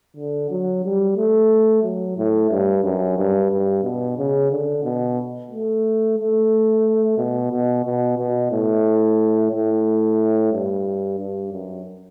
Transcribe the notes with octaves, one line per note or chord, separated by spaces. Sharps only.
D3
F#3
G3
A3
F#3
A2
G2
F#2
G2
G2
B2
C#3
D3
B2
A3
A3
B2
B2
B2
B2
A2
A2
G2
G2
F#2